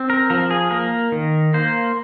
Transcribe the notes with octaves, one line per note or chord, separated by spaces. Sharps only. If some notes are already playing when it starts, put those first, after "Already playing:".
Already playing: C4
A#4
F3 A#4
G#4
A#3 A#4
D#3
A#3 C5